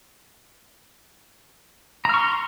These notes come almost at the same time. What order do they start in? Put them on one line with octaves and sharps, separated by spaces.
A#5 F6 C#6 C6